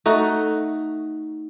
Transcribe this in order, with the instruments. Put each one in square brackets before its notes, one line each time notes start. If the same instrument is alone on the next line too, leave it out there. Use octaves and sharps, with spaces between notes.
[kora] A3 D#4 F#4